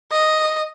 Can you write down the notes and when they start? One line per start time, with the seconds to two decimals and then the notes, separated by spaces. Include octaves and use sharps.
0.11 D#5